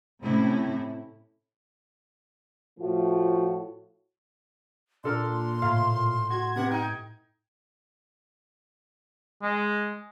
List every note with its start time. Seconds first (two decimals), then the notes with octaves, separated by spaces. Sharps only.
0.23 A2 C3 C#4 E4
2.79 A2 F3 A3 F4 F#4
5.04 A#2 D4 A4 A#4 C6
5.62 A2 F5 A#5
6.30 F#4 G#6
6.56 C3 B3 F#5
6.71 D#4 G5
9.43 G#3